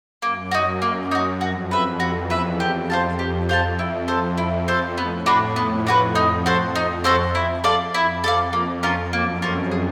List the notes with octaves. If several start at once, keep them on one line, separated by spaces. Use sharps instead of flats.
F#2 A#3
D#4 F#4
A#3
D#4 F#4
F2 F#4
B4 E5
E2 F#4
B4 E5
F2 G4
C5 F5 A5
F2 G4
C5 F5 A5
F2 E4
A4 C5
F2 E4
A4 C5
A2 B3
D4 F#4 B4
F2 B3
D4 F#4 B4
F2 D#4
F#4 A4 C5
D#4
F#4 A4 C5
E4
A4 D5 F5
F2 E4
A4 D5 F5
F2 A#3
C#4 F4 A#4
F#2 A#3
C#4 F4 A#4
G#4